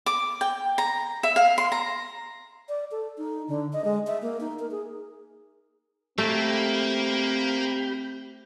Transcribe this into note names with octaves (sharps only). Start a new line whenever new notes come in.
D6
G5
A#5
E5
F5
C6
A#5
D5
A4
D#4
D3
D#5
G#3
E5
A#3
D#4
A#4
G#4
A3 A#3 C4 G4 B5 G6